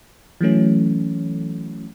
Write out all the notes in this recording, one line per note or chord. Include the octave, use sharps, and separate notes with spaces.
E3 F#3 A3 C#4